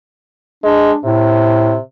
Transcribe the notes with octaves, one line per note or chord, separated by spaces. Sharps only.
G#3 D4
A2 C3